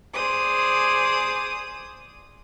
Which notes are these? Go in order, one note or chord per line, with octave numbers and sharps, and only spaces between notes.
G#4 C5 D5 D#6